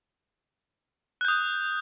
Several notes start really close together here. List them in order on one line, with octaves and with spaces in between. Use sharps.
F#6 G6 D#6